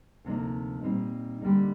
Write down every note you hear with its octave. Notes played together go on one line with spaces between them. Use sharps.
D2 C3 F3 A#3 D#4
A#2 G3 C4 D#4
D3 G3 A#3 D#4